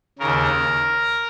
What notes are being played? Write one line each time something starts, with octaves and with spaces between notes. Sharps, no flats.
D#2 C#3 A#4